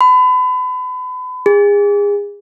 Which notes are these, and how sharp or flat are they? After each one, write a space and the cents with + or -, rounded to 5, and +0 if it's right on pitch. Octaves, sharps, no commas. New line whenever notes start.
B5 +35
G#4 -30